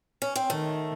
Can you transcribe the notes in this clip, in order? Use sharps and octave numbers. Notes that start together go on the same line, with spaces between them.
C#4
C4
D#3 A3